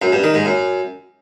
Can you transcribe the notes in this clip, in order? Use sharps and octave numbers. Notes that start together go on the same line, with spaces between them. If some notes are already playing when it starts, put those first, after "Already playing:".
F#2
G2
D#3
G#2
F#2